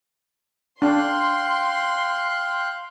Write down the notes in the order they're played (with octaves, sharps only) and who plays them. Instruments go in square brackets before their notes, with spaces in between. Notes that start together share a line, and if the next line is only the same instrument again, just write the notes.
[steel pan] D4 [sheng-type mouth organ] F5 G5 F#6 [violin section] C6